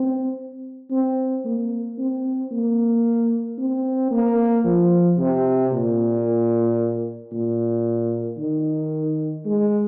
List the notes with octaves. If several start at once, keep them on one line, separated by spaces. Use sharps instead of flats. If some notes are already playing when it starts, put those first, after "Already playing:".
Already playing: C4
C4
A#3
C4
A#3
C4
A#3
F3
C3
A#2
A#2
D#3
G#3